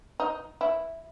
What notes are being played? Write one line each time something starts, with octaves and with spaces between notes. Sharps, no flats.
D#4
E4